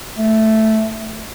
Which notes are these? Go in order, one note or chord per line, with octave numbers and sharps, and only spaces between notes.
A3